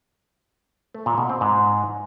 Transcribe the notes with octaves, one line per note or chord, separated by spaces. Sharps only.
A3
A#2
B2
C4
G#2